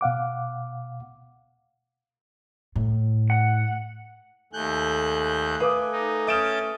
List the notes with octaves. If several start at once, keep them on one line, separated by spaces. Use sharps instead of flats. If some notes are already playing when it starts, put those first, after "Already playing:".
B2 F5 F#5 D6
A2
F#5
D#2 A3 A4 G#5 F#6 G6
B4 F5 D6 D#6
D#4
C#4 E5 D#6 F6 G6 A6 D7 E7